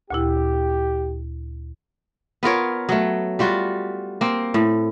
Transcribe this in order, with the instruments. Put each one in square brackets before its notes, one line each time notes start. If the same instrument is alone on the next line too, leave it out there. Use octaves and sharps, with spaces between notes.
[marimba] D2 A#2 E4 [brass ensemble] G4
[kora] B3 F4 A#4 C#5
F#3 A3
G3 F4 F#4
A#3 C4
A2